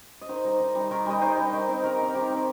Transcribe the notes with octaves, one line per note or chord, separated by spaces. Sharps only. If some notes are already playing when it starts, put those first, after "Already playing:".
D#5
D#3 C5
G3 D#4
D#3
G3 D#4
D#3 A#4
G3 D#4 D#5
D#3 C5
G3 D#4
D#3
C4 D#4
D#3 A#4
C4 D#4
D#3 G4
C4 D#4